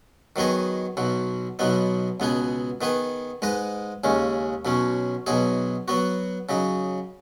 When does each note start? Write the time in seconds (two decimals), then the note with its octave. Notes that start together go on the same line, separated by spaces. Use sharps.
0.36 D#3 F#3 B3 G#4 D#5
0.97 B1 B2 F#3
1.59 B1 B2 F#3 B3 D#4
2.20 C#2 B2 B3 G#4
2.81 D#3 B3 G#4 B4
3.42 G#2 G#3 D#4 B4 D#5
4.04 D#2 C#3 G#3 C#4
4.65 B1 B2 F#3 C#4
5.27 B1 B2 F#3 D#4 G#4
5.88 F#3 B3 F#4
6.49 C#3 F#3 D#4